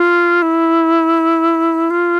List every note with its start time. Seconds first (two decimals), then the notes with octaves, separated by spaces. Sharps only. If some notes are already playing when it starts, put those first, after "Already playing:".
Already playing: F4
0.42 E4
1.90 F4